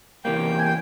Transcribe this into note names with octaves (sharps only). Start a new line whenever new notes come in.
E2 C3 E3 G3 A#3 G5
G#5
G5